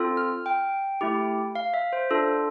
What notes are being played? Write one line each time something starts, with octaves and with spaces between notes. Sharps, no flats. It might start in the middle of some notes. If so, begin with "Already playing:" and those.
Already playing: C4 F4 A4
F6
G5
A3 E4 G4
F5
E5
C5
D4 F4 A4